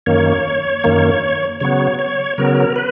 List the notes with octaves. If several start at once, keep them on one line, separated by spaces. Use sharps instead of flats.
F#2 D#3 A#3 C#5
F#2 D#3 A#3
C#3 F#3 B3 C#5
C#5
C#3 F#3 B3 A#4
B4